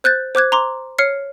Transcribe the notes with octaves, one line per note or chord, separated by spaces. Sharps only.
C5 F#6 G6 A6
C5 D6 F#6 G#6
A#5 C6 D6
C#5 F6 C7 C#7